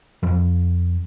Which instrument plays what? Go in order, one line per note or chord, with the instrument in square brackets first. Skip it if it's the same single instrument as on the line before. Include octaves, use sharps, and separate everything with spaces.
[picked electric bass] F2